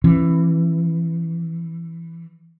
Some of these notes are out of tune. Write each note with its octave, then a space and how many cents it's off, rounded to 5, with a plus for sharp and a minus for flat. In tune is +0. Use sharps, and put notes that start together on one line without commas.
E3 +15 C#4 -40